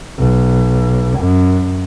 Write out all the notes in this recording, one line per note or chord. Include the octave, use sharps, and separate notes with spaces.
B1
F#2